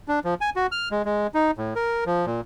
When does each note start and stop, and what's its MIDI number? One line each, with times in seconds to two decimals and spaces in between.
0.08 0.19 62
0.25 0.34 53
0.41 0.50 80
0.56 0.67 66
0.72 0.89 89
0.91 1.02 56
1.05 1.27 56
1.34 1.51 63
1.58 1.74 45
1.76 2.04 70
2.06 2.26 53
2.26 2.41 46